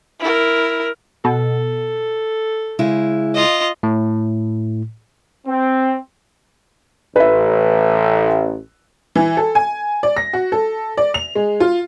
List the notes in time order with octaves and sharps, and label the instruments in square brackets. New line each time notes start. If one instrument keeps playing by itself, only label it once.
[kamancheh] E4 A#4
[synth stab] B2 [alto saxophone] A4
[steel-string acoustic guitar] C#3 G#3 E4
[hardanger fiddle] F4 D#5
[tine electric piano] A2
[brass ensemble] C4
[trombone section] A1 [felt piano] B4 E5
[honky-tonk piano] E3
A4
G#5
D5
A#6
F#4
A4
D5
F7
G#3
F4